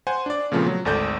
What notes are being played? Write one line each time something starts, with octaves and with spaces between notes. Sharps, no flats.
C5 F#5 G#5
D4 D5
A#2 C#3 F3 A3 B3 C4
F#3
G#1 D2 A4 D5 G6